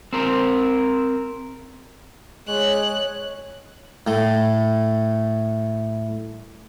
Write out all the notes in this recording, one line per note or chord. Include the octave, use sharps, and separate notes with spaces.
C4 A#4 C5
G#3 C#5 F#6
A2 A3